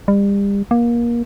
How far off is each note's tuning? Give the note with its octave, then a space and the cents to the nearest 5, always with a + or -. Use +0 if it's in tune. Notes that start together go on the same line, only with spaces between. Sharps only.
G3 +35
A#3 +25